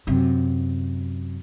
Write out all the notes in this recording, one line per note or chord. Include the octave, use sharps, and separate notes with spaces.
F#2 C3